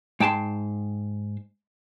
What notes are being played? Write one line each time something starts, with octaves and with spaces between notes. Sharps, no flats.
G#2 G5 A5 B5 C6